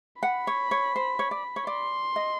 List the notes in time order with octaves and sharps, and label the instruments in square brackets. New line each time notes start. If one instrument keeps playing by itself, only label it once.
[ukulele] F#5 [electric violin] B5
[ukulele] C#5
C#5
C5
C#5
D5
C#5
[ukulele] D5 [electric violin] C6
[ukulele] D#5